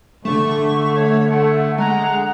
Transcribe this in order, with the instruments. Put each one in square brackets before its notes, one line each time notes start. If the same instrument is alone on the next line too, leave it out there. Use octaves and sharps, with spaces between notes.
[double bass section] D3 [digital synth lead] A3 [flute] C#6
[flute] C#5
[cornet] A3 [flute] F#5
[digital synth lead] G#3 [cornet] F#5 [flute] A#5